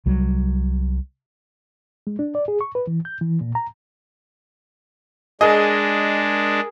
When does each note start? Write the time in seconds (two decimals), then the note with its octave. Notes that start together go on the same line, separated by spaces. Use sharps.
0.06 C2 F#3 G3
2.07 G#3
2.19 D4
2.35 D5
2.48 G#4
2.61 C#6
2.75 B4
2.87 E3
3.05 G6
3.21 E3
3.41 A#2
3.55 A#5
5.41 G#3 D4 G#4 A#4 D#5